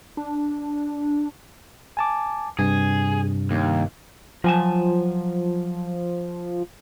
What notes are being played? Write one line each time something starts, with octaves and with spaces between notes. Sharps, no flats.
D4
G#5 A5 D6
G2 C3 G#4
D#2
F3 F#3 G#5 A5